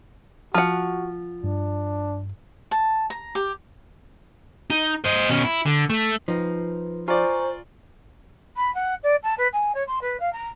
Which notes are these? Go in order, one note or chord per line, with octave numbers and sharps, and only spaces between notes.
F3 F#4 F#5
G2 D4
A5
A#5
G4
D#4
C5 D#5
B2 C#4
E4
D3
A3
F3 D#4 B4
F4 C5 D5 G#5 A#5 C#6
B5
F#5
D5
A5
B4
G#5
C#5
C6
B4
F5
A#5